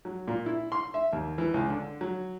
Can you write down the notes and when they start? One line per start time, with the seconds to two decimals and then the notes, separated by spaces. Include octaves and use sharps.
0.05 F#3
0.28 A#2
0.46 E4
0.72 C6
0.94 E5
1.13 D#2
1.38 E3
1.54 C#2
1.70 D3
2.01 F#3